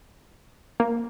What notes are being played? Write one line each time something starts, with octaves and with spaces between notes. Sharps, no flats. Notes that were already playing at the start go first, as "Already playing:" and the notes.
A#3